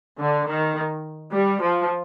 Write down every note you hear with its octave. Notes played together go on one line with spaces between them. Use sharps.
D3
D#3
G3
F3